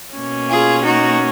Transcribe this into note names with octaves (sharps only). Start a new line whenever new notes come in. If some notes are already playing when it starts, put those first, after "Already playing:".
B2 A#3 C#4
F4 G#4
D#4 F#4